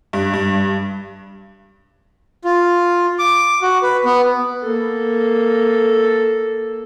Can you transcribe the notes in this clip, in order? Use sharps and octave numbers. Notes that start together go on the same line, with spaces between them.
G2
G2
F4
D6
F#4
B4
B3
A#3 A4